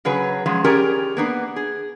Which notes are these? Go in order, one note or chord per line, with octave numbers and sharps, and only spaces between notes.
C#3 F#3 G#4 B4
F3 F#3 G#3 C#4
C#4 G4 G#4 A#4 D5 G5
A#3 B3 D4
G#4